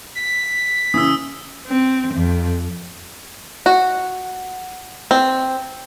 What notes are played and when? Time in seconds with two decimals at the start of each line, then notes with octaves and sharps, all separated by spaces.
0.15 B6
0.94 C#3 E3 D#6 E6
1.67 C4
2.14 F2
3.66 F#4
5.11 C4